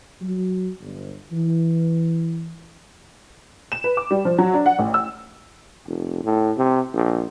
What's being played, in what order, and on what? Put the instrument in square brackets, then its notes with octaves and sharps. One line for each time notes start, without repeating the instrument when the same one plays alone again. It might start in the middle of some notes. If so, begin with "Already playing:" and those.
[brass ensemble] F#3
G1
E3
[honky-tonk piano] E7
B4
D6
G3
F3
F#3
D4
F#5
A1
E6
[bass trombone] F1
A2
C3
A#1